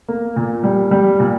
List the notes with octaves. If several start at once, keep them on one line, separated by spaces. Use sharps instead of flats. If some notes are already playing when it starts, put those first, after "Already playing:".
A#3
A#2
G3
G3
A#2